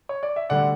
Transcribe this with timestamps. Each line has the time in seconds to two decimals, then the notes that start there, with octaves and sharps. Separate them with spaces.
0.09 C#5
0.23 D5
0.36 E5
0.50 D2 D3 G3 D5 F#5